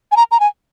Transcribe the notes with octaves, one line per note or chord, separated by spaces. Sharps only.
G#5
A#5
A#5
G#5